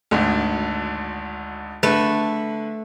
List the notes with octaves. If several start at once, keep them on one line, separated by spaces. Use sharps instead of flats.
G#1 D2
D3 A3 B4